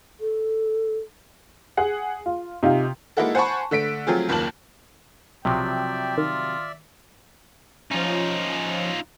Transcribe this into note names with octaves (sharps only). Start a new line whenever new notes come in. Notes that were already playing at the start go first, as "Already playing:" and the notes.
A4
G#4 F#5
F4
C3 D#4 F4
G#3 A#3 D#4 E4 F#4 A4
C5 F#5 G#5 A5 B5 C#6
D3 A3 B6 D7
F3 F#3 A3 C4 F4 G#4
F#1 D#2 A#3 F4 A5 F#7
B1 C3 F3 F#3 D5 E5 G5
D#3 F4
F3 C#4 D#4 F4